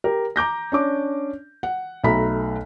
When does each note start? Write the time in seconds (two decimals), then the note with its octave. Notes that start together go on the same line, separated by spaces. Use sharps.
0.04 G4 A#4
0.36 A#5 D6 G6 A#6
0.72 C#4 D4 D6
1.63 F#5
2.04 B1 A3 E5 A#5 B5 B6